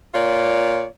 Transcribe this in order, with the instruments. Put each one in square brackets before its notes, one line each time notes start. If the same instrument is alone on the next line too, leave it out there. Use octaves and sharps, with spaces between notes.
[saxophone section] A#2 F4 C#5 D5